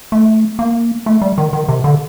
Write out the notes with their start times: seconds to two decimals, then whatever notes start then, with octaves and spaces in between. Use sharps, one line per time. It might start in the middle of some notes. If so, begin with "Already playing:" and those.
0.12 A3
0.59 A#3
1.06 A3
1.22 G3
1.38 D#3
1.53 D#3
1.69 C3
1.84 D3